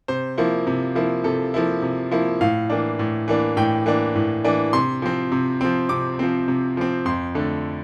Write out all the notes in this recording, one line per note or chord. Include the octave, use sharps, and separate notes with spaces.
C3 C5
F3 A#3 E4
C3
F3 A#3 E4
C3 A4
F3 A#3 E4
C3
F3 A#3 E4
A2 F5
E3 A#3 D4
A2
E3 A#3 D4
A2 G5
E3 A#3 D4
A2
E3 A#3 D4
C3 C6
F3 C4
C3
F3 C4
C3 D6
F3 C4
C3
F3 C4
F2 C6
D3 A3